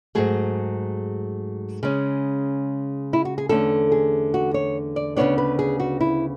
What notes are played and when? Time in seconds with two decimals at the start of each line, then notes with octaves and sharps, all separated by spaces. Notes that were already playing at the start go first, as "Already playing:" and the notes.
0.15 G#2 F#3 A3 G#4
1.83 C#3 G#3 C#4
3.13 E4
3.25 F#4
3.38 G#4
3.49 E2 D3 A3 C#4 A4
3.92 G#4
4.34 F#4
4.54 C#5
4.96 D5
5.16 D2 C#3 E3 B3 D4 C#5
5.38 B4
5.59 G#4
5.80 F#4
6.01 E4